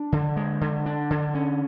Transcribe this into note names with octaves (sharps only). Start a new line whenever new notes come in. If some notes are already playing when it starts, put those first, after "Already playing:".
Already playing: D4
D3
G#3
D3
D4
D3
C#4